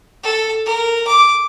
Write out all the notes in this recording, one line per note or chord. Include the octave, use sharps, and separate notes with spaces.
A4
A#4
D6